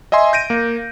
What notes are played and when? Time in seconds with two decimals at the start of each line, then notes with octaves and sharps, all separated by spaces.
0.12 D#5 E5 G#5 C6
0.33 G6 A#6 D7 D#7
0.50 A#3